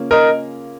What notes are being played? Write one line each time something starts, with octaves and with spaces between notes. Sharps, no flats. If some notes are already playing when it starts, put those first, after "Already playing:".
Already playing: C#3 A#3 C#4 F4
A#4 D#5